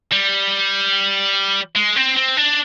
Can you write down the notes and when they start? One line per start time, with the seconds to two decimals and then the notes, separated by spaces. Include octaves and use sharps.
0.12 G3
1.75 G#3
1.96 C4
2.17 C4
2.37 D4